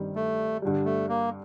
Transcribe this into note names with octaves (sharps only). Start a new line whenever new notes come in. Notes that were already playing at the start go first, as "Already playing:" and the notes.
Already playing: G2 D#3 G3 C4
A3
G2 D3 G3
A3
A#3